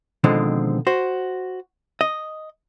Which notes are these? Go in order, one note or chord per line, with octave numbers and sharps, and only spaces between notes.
B2 D3 D#3 F3 G#3 C4
F#4 C5
D#5